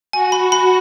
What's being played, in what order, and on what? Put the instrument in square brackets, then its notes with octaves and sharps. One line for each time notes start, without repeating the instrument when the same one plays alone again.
[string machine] F#4 [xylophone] G#5
[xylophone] B5
B5